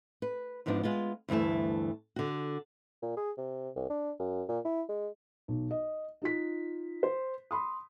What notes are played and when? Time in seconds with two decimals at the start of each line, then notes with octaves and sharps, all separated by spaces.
0.22 B4
0.66 E2 G#2 F3 B3 D4
0.83 G#3 B3 F4
1.29 D2 G2 E3 A3 A5
2.16 D3 F#4
3.02 A#2
3.17 G#4
3.37 C3
3.76 C2
3.90 D4
4.19 F#2
4.49 A#2
4.65 E4
4.89 G#3
5.48 B1
5.71 D#5
6.22 D#4 F4 B6
7.03 C5
7.51 B5 C6 D#6